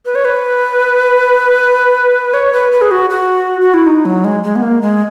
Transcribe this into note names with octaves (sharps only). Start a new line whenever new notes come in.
B4
C#5
B4
C#5
B4
B4
G#4
F#4
F#4
F#4
E4
D#4
F#3
G#3
G#3
B3
A#3
G#3